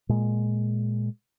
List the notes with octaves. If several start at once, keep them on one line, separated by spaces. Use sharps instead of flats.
A#2 G#3